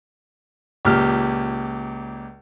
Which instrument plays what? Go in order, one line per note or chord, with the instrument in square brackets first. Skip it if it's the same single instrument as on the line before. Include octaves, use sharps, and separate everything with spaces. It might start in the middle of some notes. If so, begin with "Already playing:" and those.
[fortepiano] C#2 A#2 G4 F6